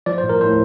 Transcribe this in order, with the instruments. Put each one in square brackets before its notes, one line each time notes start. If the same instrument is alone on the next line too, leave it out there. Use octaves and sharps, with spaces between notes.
[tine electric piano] F3 D5
C5
A2
A#4
A2 C5